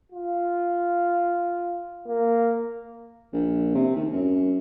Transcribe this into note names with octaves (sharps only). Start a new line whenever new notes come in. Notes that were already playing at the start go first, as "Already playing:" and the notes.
F4
A#3
A#1
C3
D#2
F#2